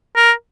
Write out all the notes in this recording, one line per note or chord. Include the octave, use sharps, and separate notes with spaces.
A#4